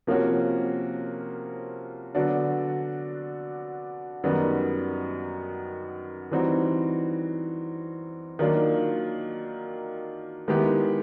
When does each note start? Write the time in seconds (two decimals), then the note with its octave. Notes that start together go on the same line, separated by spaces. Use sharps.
0.07 C3 F3 A#3 C#4 F#4
2.15 D3 F#3 B3 D4 F#4
4.24 F#2 D#3 G3 B3
6.31 E3 G3 C4 D#4 F#4
8.39 D#3 F#3 A#3 D4 F4
10.48 D#3 G#3 B3 E4 G4